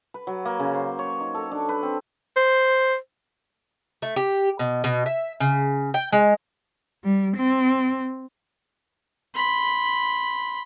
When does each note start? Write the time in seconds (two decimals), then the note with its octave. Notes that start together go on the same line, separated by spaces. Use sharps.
0.14 B4
0.27 F#3
0.45 A#3
0.60 C#3
0.74 C5
0.99 C#5
1.21 D#4
1.34 A4
1.51 D4
1.69 B4
1.83 C4
2.37 C5
4.02 A3
4.16 G4
4.59 B2
4.84 B2
5.06 E5
5.40 C#3
5.94 G5
6.12 G#3
7.04 G3
7.37 C4
9.35 B5 C6